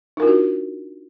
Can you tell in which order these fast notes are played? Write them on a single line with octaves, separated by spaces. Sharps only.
D#4 A#4 F4 D4 F#4